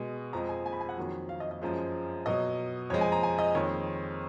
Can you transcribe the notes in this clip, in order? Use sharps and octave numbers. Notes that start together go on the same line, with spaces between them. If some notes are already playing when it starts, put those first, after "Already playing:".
Already playing: B2 G#3
F2 F3 G#3 A#5
G#5
G#5
B5
G#5
F#5
F2 D#3 F#3
F5
D#5
D#5
F#2 F3 G#3
B2 F#3 D#5
F2 F3 G#3 C#5
G#5
A#5
G#5
D#5
F2 D#3 G#3 C#5